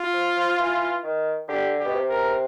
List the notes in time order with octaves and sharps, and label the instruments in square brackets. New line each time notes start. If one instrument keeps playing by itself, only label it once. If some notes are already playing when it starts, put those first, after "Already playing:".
Already playing: [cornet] F4
[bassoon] F3
F3
E3
D#3
[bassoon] D3 [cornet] G4
[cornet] G4
[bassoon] B2
C3
[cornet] A#4